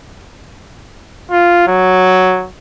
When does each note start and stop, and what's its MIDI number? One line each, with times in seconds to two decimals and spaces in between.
1.31 1.66 65
1.67 2.46 54